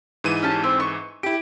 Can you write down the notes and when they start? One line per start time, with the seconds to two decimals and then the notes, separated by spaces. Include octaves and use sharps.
0.24 G#2 E3 D#7
0.43 C#4 G4 A5
0.64 C4
0.80 C#6
1.23 E4 G4 D7